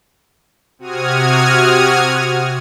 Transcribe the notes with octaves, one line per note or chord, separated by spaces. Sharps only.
C3 F#4 D#6 F6 G#6